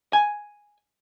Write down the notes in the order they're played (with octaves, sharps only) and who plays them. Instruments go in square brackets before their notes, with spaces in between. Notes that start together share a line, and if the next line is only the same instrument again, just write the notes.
[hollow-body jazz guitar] G#5